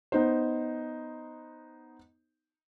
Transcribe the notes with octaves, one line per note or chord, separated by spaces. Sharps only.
B3 D#4 C5